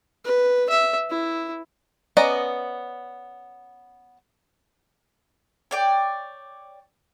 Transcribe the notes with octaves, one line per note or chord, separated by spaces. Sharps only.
B4
E5
E4
B3 C#4 D5 D#5 A#5
C#5 D5 G5